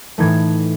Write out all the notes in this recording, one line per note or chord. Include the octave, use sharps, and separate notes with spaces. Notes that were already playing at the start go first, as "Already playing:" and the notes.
A2 E3 A3 D#4 G#6